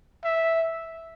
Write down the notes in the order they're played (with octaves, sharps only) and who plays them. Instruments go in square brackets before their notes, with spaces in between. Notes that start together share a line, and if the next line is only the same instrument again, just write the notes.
[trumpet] E5